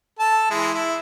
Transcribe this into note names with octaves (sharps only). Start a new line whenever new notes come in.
A4 A5
E3 G#3 E4
E4